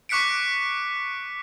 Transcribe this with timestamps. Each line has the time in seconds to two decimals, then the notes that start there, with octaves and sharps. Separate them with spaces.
0.09 C#6 D6 F#6 B6 C#7 D7